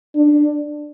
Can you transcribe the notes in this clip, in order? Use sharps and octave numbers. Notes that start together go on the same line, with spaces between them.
D4